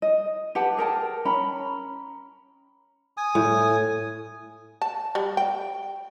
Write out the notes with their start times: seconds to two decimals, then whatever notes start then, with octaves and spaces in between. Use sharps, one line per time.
0.02 D#5
0.55 G4 B4 F#5 A5
0.77 G#4 A#4 G5 A5
1.25 C#4 A#5 B5
3.17 G#5 D#6
3.35 A2
4.82 A5
5.15 G3
5.37 G5